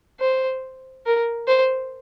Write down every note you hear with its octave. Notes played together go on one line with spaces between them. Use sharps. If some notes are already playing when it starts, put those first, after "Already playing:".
C5
A#4
C5